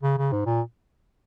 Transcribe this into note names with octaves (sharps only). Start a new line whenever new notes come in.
C#3
C#3
G#2
A#2